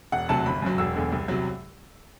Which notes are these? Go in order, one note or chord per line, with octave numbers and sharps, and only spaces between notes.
E1 F#5
D2 C3 F#3 A5
G1 B5
F#2 F#3
E1 E6
E2 D3
C2
C3 F#3